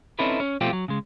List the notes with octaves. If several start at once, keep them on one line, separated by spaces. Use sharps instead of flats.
C4 C#4 D#4 E4 A4 B4
C#4
B2 F3 A3 C4 F4 G4
F#3
C#3 G#3